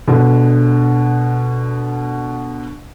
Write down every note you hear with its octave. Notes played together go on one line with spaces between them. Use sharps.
B2 D3 D4